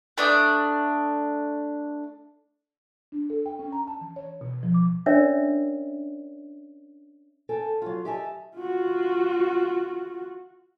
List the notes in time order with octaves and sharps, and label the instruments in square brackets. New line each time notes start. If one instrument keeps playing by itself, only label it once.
[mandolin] A3 D4 D5 D#6
[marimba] D4
A4
G5
C#4
A#5
A5
E3
C#5
B2
F3
D6
[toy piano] C#4 D4 A#4 C#5 D5 E5
[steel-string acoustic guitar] A4 G5 G#5
F#3 F4
G4 D#5 E5 G#5 A5
[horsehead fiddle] F4 F#4